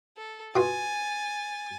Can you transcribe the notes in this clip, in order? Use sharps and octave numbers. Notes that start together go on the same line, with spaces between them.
A4
B2 F4 G#5 A6